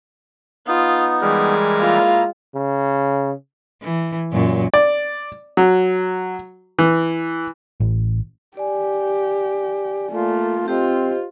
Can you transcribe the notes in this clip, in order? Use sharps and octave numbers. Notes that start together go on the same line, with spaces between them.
B3 D#4 F4
E3 G3 G#3 A#4
A#3 E4 F4 A#5
C#3
E3
F#2 A#2 F#3
D5
F#3
E3
A1
G4 D5 G#5
A3 A#3 F4
C4 F4 G4 C5 D#5